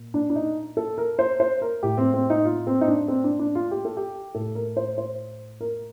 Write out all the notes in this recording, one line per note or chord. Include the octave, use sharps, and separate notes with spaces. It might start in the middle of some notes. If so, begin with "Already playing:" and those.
Already playing: A#2
D4
D4
D#4
A4
A#4
C5
C5
A#4
A2 G4
C4
C4
D#4
F4
C4
D#4
D4
C4
D4
D4
F4
G4
A4
G4
A2 A4
A#4
C5
C5
A#4